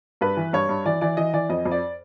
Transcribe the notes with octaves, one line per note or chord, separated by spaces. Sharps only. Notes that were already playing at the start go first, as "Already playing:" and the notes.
G2 B4
E3
G2 C#5
G2
E3 D5
E3 D5
E3 D#5
E3 D5
F2 D#5
F2
D5